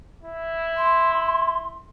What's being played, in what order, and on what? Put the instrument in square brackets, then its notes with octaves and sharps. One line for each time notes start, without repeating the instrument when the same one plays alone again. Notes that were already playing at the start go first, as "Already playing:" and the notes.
[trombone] E4
[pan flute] C6